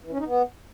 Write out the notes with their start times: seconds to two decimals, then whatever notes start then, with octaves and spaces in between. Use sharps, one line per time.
0.04 E3
0.11 C#4
0.19 D#4
0.26 B3